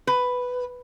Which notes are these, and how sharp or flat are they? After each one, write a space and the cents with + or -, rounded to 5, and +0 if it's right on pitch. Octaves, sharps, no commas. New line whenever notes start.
B4 +5